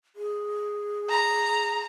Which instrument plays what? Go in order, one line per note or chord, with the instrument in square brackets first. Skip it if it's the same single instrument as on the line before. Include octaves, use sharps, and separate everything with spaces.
[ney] G#4
[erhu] A#5